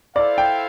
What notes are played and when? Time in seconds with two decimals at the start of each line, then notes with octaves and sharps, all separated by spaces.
0.16 E4 A4 C5 D5 F5
0.38 G5